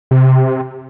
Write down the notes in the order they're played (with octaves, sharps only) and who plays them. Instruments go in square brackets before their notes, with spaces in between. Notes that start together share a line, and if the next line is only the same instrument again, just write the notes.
[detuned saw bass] C3